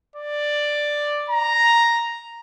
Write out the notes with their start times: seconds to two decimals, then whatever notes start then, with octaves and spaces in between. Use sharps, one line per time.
0.16 D5
1.30 A#5